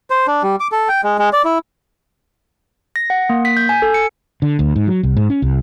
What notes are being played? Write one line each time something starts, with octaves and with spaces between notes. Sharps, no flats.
C5
D4
G3
D6
A4
G5
G#3
G#3
D5
E4
A#6
F#5
A#3
B6
G6
G#5
A4
C#7
D3
D2
G#2
F#3
C2
G#2
C#4
C2